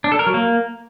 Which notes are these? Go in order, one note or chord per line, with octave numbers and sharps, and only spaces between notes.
D4
A4
A#4
F#3
A#3